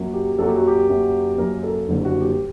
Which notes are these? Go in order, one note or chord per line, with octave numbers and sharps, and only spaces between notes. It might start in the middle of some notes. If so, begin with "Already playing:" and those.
Already playing: F#2 F#3 A#3
G4
F#2 F#3 A#3 A4
G4
F#4
G4
F#2 F#3 A#3
F#2 F#3 A#3 A#4
A4
F#1 F#2 D3 G3 A#3
F#4
G4